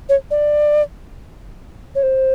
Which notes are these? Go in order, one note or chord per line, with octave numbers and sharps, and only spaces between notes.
C#5
D5
C#5
C5